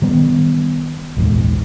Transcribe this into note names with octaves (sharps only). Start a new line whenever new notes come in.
D#3 G3 B3
A#1 E2 G#2